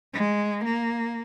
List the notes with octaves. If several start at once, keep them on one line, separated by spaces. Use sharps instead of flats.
G#3
A#3